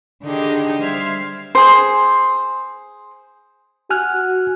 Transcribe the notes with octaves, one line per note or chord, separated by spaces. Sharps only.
D3 D#3 D4 D#4 G4 G#4
G3 C5 E5 F5 F6 G#6
G#4 C5
F#4 G#5 F6 F#6